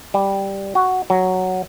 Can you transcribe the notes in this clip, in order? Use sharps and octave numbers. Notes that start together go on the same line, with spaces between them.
G3
F#4
F#3